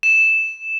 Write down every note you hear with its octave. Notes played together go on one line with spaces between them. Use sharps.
E7